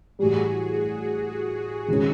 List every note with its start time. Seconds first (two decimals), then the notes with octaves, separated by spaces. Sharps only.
0.19 A2 E3 G3 F#4 G#4
1.88 D#3 G#3 C#4